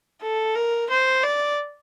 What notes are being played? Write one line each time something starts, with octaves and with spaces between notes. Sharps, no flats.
A4
A#4
C5
D5